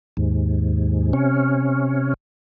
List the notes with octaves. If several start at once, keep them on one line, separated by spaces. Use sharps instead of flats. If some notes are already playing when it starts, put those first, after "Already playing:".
D#2 G#2
C3 C#4